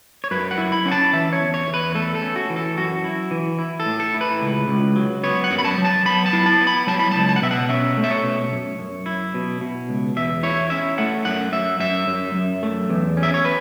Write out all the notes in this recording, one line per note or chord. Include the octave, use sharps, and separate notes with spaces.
C#5
F#2 B4
F#5
E4
B5
C#4 F#5
A5
E3 E5
C#5
E2
C#5
E2
B4
A3 A4
A4
C#4
F#4
E3
A4
F#2 F#4
E4
E3
E4
A4
A2
A4
E4
B4
C#2
C#2
F#3
B3 C#5
F#5
F#2
B5
A5
F#3
A5
B3 B5
A5
E4
A5
B3
B5
F#3 A5
B5
C#2 A5
A5
F#5
B2 E5
F#5
C#4 E5
A3
E5
C#5
B2
F#2
F#2
E4
B2
B2
C#2
E2 E5
E4 C#5
C#4 E5
A3 F#5
F#2 F#5
F#2 E5
F#2 E5
F#2
F#2
A3
E2
C#4
E5
C#5
B4